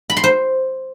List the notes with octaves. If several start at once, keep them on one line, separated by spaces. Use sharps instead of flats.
B5
C6
C5